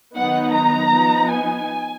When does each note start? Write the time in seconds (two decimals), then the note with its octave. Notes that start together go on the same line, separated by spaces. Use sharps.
0.15 D#3 F#3 B3 D#4 F#5
0.53 A#5
0.92 F3 B3 D#4
1.31 G#5